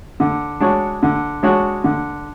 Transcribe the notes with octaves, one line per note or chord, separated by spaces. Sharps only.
D3
G#3 D4 F#4 C#5
D3
G#3 D4 F#4 C#5
D3